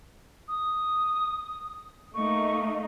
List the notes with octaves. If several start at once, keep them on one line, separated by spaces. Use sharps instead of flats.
D#6
A3 A#3 D#4 C#6